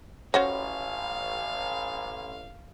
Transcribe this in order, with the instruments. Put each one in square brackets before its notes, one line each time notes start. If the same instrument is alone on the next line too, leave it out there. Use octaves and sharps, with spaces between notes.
[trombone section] A1 [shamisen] C#4 F#4 C5 [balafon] C#5 [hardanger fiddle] F5